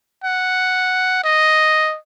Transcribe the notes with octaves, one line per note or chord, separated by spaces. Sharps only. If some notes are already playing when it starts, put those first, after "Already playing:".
F#5
D#5